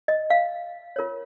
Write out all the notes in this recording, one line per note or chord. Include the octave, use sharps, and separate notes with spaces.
D#5
F5
F4 A#4 C#5